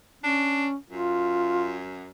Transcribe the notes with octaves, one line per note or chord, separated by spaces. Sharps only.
C#4 D4
F#2 F4